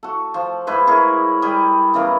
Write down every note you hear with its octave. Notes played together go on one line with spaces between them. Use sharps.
F#4 A4
F3
G#2 E4 B4 C6
E4 G#4 A#4 C#5
G3 G#4
C#3 E3 B3 A#4